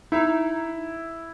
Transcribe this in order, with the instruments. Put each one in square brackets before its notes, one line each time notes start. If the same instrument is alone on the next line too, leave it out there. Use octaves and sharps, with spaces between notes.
[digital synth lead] D#4 [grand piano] E4